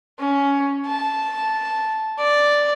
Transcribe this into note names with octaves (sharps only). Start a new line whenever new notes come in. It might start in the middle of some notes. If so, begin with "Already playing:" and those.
C#4
A5
D5